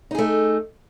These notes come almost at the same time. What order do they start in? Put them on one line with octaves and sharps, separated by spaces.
D#4 G#4 A3